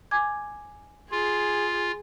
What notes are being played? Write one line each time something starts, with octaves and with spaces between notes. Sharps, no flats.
G#5 D6 G#6
F4 G#4